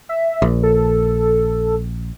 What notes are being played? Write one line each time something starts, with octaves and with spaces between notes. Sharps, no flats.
E5
A#1
A4